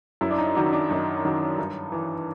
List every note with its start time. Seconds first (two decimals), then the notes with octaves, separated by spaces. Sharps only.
0.21 F#2 E4
0.31 D4
0.38 D#4
0.55 D#3 F#3 D4
0.73 D4
0.89 F#2 D#4
1.25 D#3 F#3
1.58 G2
1.92 E3